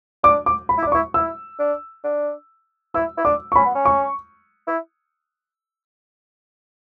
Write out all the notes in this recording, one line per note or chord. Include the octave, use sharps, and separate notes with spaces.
D4 D6
D6
B5
E4
D4 D6
E4 C#6
E4 E6
D4
D4
E4 E6
E4
D4 D6
C#6
C#4 B5
B3
C#4
C#6
E4